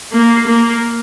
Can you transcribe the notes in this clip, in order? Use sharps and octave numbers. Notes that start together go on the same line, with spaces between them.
A#3
A#3